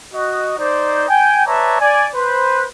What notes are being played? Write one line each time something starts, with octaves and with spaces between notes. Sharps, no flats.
F#4 D#5
D#4 C5 D5
G5 G#5
B4 C#5 D5 E5 A5 A#5
D5 G#5
B4 C5